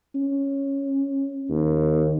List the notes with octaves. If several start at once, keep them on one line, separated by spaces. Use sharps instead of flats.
C#4
D#2